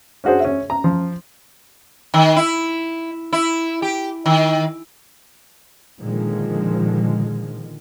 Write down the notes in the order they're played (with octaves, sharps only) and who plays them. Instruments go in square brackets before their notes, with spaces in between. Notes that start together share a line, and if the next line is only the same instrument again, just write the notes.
[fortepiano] C#4 D4 F#4 G#4 C5
C#4 E5
A#5
F3
[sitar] D#3
E4
E4
G4
D#3
[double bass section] A#2 D3 D#3 F3 G#3